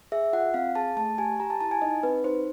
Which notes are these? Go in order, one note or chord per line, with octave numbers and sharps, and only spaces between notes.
G#4 E5
F4 F#5
C4 F5
G#4 A5
A3 A5
G4 G#5
G4 A#5
A5
E4 A5
G#5
D#4 D#5
C4 B4
D#4 C5